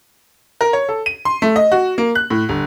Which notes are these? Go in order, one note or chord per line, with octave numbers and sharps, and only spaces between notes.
A#4
C#5
A4
D#7
C6
A3
D#5
F#4
A#3
F#6
A2
G1